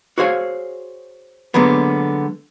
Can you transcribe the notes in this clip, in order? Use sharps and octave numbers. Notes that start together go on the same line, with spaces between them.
F#4 G#4 C5 C#5 F5
D3 F#3 G#3 A#3 B3